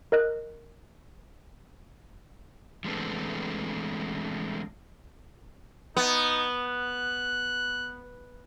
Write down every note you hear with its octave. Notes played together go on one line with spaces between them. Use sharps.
A#4 D#5 F#6
E3 G#3 A3 B3 C4 D4
B3 D#4
F#6